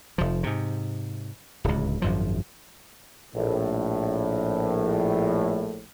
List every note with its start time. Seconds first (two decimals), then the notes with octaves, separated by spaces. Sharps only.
0.18 F1 F3
0.43 G#2 C3
1.64 D1 C#2
2.02 G#1 F#2 F3
3.36 A#1 A2